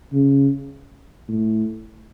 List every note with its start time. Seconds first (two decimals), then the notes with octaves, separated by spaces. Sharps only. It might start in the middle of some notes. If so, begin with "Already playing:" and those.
0.13 C#3
1.29 A2